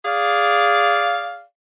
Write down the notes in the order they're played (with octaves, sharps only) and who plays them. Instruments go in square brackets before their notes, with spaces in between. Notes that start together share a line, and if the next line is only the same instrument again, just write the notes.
[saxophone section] G#4 D5 F5